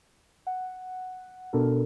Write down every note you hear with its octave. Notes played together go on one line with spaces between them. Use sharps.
F#5
B2 B3 D4 F#4 A4 A#4